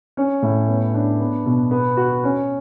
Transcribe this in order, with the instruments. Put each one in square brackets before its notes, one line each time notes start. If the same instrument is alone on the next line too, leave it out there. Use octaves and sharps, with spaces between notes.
[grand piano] C#4
A2
B3
D4
B3
B2
B3
F#4
C#4